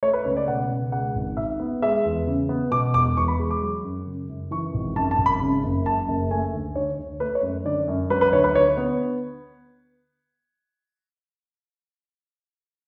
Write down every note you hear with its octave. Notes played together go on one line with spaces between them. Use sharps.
A3 C#5
B4
C#2 C#5
D5
B2 F#5
C#2
G#3 F#5
G#1
G#2 E5
B3
G#3 E5
E2
C#3
B3
B2 D6
E1 D6
E2 C#6
B5
G#3
D6
F#3
F#2
C#3
F#2
E3 C#6
G#1
F#2 A5
A5
G#1
B5
C#3
F#1
F#2 A5
F#1
A3 G#5
D2
D3 C#5
D2
A3 B4
C#5
F#2
D3 D5
F#2
F#3 B4
B4
D2 C#5
B4
D3 C#5
B3